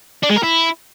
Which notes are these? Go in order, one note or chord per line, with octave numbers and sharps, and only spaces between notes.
D4
G#3
A#4
E4